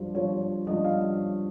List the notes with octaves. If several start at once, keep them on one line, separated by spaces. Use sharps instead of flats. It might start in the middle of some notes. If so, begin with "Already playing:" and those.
Already playing: G2 F3 C5
G2 F3 C#5
G2 F3 D#5
F5